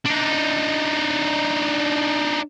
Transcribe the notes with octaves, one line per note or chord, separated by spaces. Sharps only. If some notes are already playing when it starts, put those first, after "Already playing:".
D4 D#4